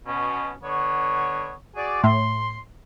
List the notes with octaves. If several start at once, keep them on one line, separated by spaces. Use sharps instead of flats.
B2 C#4
D3 B3 C#5
F#4 G#4 D5
A2 C6